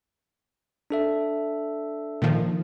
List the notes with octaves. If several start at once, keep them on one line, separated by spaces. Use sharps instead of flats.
D4 A4 E5
A#2 D#3 F3